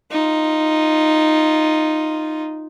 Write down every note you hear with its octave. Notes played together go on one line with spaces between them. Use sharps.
D#4 F4